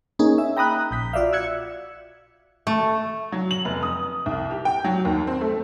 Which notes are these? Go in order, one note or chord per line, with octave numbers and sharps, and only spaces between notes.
A#3 C#4 D#4 G#4
E5
G5 A#5 B5 D#6 F#6
A#1 G6 B6
F4 F#4 D5 E5 F5
E6 F#6 G#6 C#7
A3
F#3
F#7
F1
D#6
C2
G4
G5
F#3
D#2
C4
A3